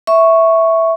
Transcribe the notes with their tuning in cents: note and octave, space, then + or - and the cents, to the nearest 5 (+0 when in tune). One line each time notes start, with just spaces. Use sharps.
E5 -5 C#6 +0